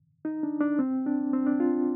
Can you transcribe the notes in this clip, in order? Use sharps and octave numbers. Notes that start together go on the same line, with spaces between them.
D#4
D4
D4
C4
D4
C4
D4
F4